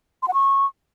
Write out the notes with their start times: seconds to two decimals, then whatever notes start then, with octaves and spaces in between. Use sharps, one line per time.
0.23 C6
0.28 F#5
0.34 C#6